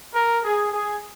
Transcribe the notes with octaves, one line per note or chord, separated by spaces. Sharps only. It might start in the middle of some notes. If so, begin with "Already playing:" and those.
A#4
G#4
G#4